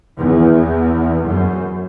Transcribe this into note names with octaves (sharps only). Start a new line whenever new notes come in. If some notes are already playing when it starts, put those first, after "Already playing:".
E2
F#2